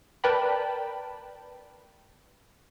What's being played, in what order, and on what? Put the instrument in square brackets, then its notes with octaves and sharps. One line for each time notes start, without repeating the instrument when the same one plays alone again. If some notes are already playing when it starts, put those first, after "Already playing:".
[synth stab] A#4 B4 D5 G5 A5 B5